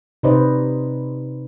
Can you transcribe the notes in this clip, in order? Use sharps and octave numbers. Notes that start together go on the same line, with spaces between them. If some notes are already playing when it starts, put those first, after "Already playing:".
C3 D#4 B4 C5 D5 D#5